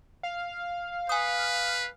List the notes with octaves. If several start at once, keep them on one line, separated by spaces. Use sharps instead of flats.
F5
B4 G#5 D#6